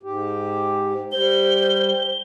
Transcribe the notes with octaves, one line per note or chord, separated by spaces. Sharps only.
G#2 G4
G3 C5 G7